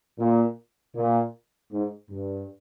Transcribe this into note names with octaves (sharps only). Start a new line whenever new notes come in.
A#2
A#2
G#2
G2